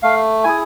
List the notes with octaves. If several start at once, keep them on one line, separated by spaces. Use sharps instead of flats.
A3 F5
E4 G#4 G#5